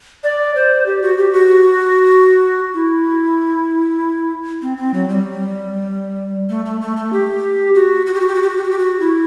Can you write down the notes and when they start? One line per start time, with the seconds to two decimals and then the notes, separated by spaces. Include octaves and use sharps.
0.24 D5
0.55 C5
0.86 G4
1.02 F#4
1.18 G4
1.33 F#4
2.74 E4
4.62 C4
4.77 C4
4.94 F#3
5.09 G3
6.49 A3
6.66 A3
6.81 A3
6.97 A3
7.13 G4
7.75 F#4
8.06 F#4
8.14 G4
8.21 F#4
8.28 G4
8.35 F#4
8.42 G4
8.49 F#4
8.57 G4
8.64 F#4
8.71 G4
8.79 F#4
9.00 E4